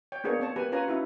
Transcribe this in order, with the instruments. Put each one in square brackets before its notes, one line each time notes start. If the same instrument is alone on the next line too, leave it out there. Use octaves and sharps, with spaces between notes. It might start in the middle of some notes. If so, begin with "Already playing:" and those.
[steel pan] C#5 G5
A#3 B3 D4 G#4 C#5
C4 C#5 A5
A#3 G4 B4 G#5
C#4 F4 B4 C#5 G#5 A#5
C#4 D#4 E4 F#4